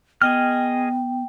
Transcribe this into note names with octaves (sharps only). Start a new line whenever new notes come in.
B3 G#4 D#5 G5 F6